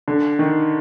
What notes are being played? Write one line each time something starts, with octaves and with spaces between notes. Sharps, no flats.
D3
D#3